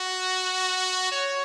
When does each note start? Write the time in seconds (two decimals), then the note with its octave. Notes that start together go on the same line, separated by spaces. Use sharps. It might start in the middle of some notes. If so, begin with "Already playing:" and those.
Already playing: F#4
1.12 C#5